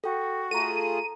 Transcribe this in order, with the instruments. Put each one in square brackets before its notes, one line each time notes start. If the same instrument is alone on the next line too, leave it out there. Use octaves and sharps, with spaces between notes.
[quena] F#4 [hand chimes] A4 G5
[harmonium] A3 F4 G#4 [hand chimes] A4 A#5 [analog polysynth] D#7